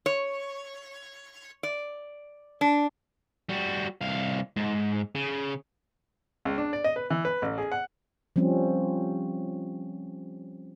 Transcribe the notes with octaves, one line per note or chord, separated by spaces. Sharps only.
C#5
D5
D4
G3 F#4
C2 F5
G#2
C#3
C#2
D4
D5
D#5
B4
E3
B4
A1
G#4
F#5
F3 G3 C4 C#4